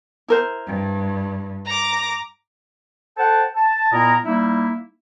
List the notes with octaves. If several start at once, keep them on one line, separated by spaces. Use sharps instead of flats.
E4 A#4 C5
G2
A#5 D6
A4 C5 F#5 G5 A5
A5
A#2 B3 E4 A#4 D#5 A#5
G3 A#3 D#4 E4